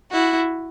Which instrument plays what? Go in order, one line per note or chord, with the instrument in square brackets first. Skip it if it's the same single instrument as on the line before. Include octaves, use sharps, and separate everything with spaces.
[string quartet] E4 F#4